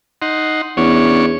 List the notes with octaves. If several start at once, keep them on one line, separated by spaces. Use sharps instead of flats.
D#4 F#5 C6
E2 C#4 D4 C#5